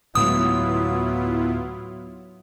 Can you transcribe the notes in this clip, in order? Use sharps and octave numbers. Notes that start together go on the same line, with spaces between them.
D2 A2 F#3 G#3 B3 E4 F4 D#6